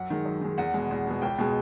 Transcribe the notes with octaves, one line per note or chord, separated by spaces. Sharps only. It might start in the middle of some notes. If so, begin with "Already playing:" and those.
Already playing: F#2 F#5
D#3 G#3
F#2
D#3 G#3
E2 F#5
B2 G#3
E2
B2 G#3
C#2 G5
B2 G#3